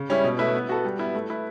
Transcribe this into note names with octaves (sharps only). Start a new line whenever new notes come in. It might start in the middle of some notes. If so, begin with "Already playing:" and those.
Already playing: C#3
G3 C#4 E4
B2
A3 E4 B4 E5
B3
F#4 A4
G3
B3 E4
A3
E4 B4